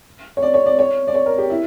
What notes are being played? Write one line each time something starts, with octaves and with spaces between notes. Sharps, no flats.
C#5
D5
C#5
D5
C#5
D5
C#5
A#4
G4
E4